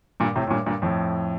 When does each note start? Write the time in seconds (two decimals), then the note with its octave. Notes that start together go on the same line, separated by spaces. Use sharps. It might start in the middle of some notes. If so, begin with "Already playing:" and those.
0.20 G2 A#2
0.36 A2 C3
0.47 A2
0.50 G2 A#2
0.66 G2 A#2
0.82 F2 A2